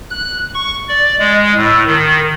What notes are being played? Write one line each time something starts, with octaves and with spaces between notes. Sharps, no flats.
F#6
C#6
D5
G#3
A2
D#3